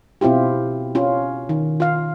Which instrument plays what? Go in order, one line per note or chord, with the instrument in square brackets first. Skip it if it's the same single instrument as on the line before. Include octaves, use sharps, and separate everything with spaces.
[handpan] B2 C4 E4 F4 G4
C#4 F4
D#3
F4 F5